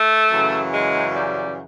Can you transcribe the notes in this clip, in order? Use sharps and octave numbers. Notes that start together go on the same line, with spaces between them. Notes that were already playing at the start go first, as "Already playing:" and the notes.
Already playing: A3
F#2 C#3 E3
G#3
G3